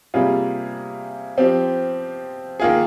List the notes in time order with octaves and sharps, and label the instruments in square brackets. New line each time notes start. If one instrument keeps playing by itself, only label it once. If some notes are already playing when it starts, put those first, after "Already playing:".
[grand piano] C3 G3 A#3 F4 G#4
F3 C4 G4
D#3 A#3 F4 G#4